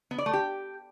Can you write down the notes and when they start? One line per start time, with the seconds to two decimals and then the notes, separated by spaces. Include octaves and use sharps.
0.11 B3
0.18 D5
0.26 A3
0.33 G4